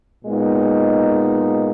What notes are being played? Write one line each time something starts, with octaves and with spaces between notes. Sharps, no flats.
A#2 G#3 B3 D#4